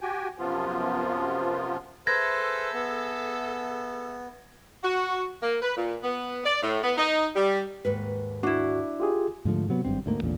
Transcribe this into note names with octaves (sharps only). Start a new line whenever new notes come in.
F#4 G4 G5 G#5
F#2 C3 F3 B3 F4
G#4 A4 B4 C5 E5 G#6 A#6
B3
F#4
A#3
B4
A#2
B3
D5
A2
B3
D#4
G3
D#2 G#2 B4
D4 E4 F#4
F4 G4 G#4
G#2 D3 F3 A3
C3 F#3 B3
G#1 G2 C4
D2 G#2 A3 A#3
A1 E2 A#2 D3